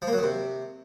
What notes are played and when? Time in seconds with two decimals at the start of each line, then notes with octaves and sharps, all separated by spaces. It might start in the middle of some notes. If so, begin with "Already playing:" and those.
0.02 F3
0.07 A#3
0.13 F#3
0.18 D#3
0.23 C3